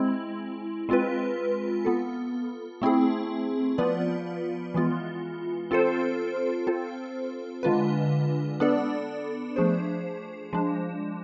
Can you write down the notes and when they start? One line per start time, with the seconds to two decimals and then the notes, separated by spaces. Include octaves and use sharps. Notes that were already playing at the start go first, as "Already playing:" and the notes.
Already playing: G#3 C4 E4
0.89 G#3 C4 F4 B4
1.85 B3 F4 A4
2.82 A3 C4 E4 G#4
3.78 F3 B3 F4 B4 D5
4.74 E3 G#3 B3 F4
5.71 C4 F4 A4 C5
6.67 C4 F4 A4 C5
7.63 D3 G#3 D4 F4 B4
8.60 B3 D4 A4 D5
9.56 F3 A3 D4 G#4 C5
10.53 F3 G#3 D4